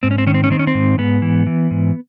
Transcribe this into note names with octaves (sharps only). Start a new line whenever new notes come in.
G#2 C4
C#4
C4
D#3 C#4
C4
C#4
D#3 C4
C#4
C4
G#2
G#2 B3
E3
E3
G#2